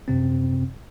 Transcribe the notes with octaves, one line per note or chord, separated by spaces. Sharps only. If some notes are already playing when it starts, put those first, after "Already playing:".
F#2 C3 C4